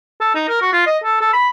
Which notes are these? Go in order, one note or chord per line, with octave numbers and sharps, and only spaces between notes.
A4
D#4
A#4
F#4
F4
D#5
A4
A4
B5